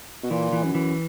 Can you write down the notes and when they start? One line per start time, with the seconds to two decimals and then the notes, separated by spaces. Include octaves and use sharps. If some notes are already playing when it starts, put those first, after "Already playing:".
0.23 B2
0.31 A#2 E3
0.53 E3
0.64 F#2
0.75 E3